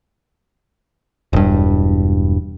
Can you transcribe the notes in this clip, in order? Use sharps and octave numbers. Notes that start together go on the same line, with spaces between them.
E1 G2